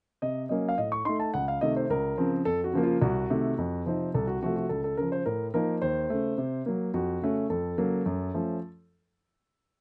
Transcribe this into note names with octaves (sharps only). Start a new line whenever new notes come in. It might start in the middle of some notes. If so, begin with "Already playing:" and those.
C3 D#5
F#3 A#3 C#4 D#5
F5
A2 D#5
C#6
A3 D#4 C6
A5
C#2 F#5
F5
C3 D#3 A3 D#5
C5
C#2 A#4
C#3 F3 C4
F2 A4
F#4
C#3 F3 A#3
F4
C2 F#4
C3 D#3 A3
F2
C3 F3 C4 D#4
C2 A4
F#4
C3 F3 A3 F#4
F#4
C#2 A4
A4
C#3 F3 A#4
C5
A2 A#4
F3 A#3 D#4 A#4
D#2 C5
C#3 A3
C3
F#3 A#3
F2 F#4
C#3 A3 C#4
F2 A4
C#3 F#3 A#3
F#2
F3 A3 C#4